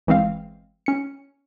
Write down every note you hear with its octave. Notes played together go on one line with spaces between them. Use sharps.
G1 E3 G#3 C4 F5
C#4 C#7